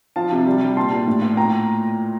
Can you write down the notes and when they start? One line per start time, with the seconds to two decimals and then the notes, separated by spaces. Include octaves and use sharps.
0.16 F3 F5 A5
0.32 C3
0.46 G3
0.62 G3
0.77 A#2 A5 C6
0.92 A#2
1.07 A2
1.22 A2
1.37 A#2 G5 A#5